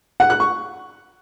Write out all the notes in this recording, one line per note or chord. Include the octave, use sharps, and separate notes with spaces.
F#5
F#6
C#6